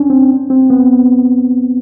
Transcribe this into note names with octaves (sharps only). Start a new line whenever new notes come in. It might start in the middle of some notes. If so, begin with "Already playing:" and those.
Already playing: C#4 D4
C4
C4
B3